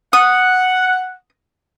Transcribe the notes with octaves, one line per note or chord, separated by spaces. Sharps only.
F#5 D#6